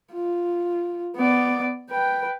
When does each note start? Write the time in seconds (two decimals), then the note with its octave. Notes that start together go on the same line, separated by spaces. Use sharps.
0.13 F4
1.16 B3 D5
1.90 B4 G5